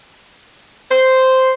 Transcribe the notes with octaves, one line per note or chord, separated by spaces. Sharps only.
C5